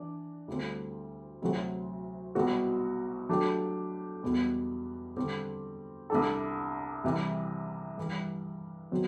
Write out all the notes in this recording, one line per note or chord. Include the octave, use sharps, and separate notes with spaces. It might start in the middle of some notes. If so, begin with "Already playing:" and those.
Already playing: E3 D4 D5
D2 D3 G3 C4
D2 C3 F#3 C4 F#4
C2 B2 G3 C4 F#4
F#3 A3 D4 G4
E2 B2 G3 B3
D3 G3 C4 G4
C2 C3 G3 D4 A4
C2 C3 E3 G3
G2 E3 G3
B2 F#3 C4